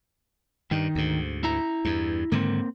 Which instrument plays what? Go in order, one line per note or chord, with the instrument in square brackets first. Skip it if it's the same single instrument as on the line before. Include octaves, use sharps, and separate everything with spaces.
[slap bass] G2 [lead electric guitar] D#3 D#4
[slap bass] D2 G#2
[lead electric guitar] E4 A#5
[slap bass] E2 G2
[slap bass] G#2 D3 D#3 [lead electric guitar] A#3 C4